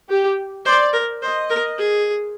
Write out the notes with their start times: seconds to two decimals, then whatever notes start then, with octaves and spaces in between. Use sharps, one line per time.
0.09 G4
0.65 C5 D5
0.93 A#4
1.22 C5 D#5
1.50 A#4
1.78 G#4